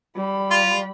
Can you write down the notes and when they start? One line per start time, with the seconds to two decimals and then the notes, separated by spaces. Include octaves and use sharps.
0.16 G3 B5
0.51 F4